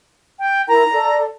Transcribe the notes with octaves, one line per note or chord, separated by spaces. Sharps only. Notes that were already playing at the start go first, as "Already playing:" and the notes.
G5
E4 A#4 A#5
A4 D5